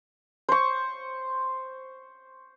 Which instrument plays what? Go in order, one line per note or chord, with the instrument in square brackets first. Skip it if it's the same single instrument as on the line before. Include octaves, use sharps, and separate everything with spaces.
[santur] C5 C#6